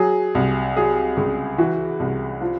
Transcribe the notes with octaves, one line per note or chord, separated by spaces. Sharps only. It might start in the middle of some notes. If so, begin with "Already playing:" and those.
Already playing: F#3 G#4
C2
F#3 G#4
C#2
E3 F#4
C2
F3 F4